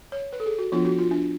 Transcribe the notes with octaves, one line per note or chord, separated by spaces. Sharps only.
C#5
B4
A4
G#4
F#4
F3 B3 D4 F4
F#4
F4
D4